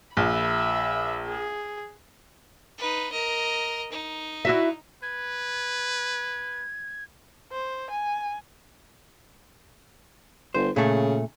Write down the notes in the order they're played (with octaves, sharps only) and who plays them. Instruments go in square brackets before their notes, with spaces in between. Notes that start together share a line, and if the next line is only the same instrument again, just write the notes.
[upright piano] A#1 [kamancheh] E5 B5
[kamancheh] G#4
[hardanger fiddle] D#4 B4
A#4 D#5
D#4
[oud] E4 F#4 E5
[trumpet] B4 [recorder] G#6
[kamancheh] C5
G#5
[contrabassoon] G1 [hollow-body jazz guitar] C5
[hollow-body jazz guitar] A#2 A3 [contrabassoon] C#3